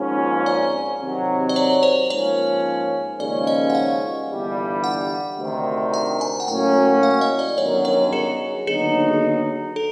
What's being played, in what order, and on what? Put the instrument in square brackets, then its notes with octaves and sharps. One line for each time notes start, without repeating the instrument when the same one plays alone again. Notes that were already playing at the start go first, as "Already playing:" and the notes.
Already playing: [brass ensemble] G#1 G#2 F3 A#3 C#4
[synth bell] D5
[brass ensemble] C3 D#3 F#3
[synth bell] D5
C#5
C5
[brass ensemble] G#2 F3 A#3 C#4 [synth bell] C#5
[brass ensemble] D#2 C#3 F3 G#3 C#4 [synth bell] D5
[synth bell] D#5
F#5
F5
[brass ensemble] G1 G2 E3 G3
[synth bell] F#5
[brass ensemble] D2 C3 D#3
[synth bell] G5
G#5
F#5
[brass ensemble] A2 F#3 A#3 C#4 F#4 [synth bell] G5
[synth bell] F5
D#5
D5
[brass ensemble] G1 F#2 D#3 F#3 [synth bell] C#5
[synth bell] C#5
G#4
[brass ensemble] D#2 D3 F#3 B3 D#4 [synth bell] G#4
[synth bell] A4